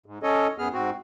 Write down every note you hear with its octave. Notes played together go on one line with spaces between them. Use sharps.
G#2
C#4 A4 C#5 D#5
F#2 B3 G#4 F6
G#2 C4 F#4